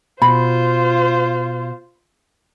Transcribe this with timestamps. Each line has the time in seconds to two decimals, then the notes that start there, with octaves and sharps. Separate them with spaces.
0.22 B2 F4 C5 B5